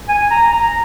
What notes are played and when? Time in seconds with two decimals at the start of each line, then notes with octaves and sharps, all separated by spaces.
0.09 G#5
0.30 A#5
0.52 A#5